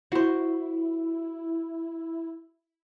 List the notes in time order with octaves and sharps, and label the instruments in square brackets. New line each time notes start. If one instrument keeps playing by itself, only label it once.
[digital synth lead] E4 [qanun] F#4 C5